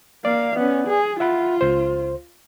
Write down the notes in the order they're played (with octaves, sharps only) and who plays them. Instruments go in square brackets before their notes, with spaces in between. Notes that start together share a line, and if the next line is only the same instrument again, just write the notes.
[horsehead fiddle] A#3 F5 [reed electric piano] D5
[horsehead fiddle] B3 C#4
G#4
[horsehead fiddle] F4 [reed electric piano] E5 F#5 B5
[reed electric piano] C#2 C5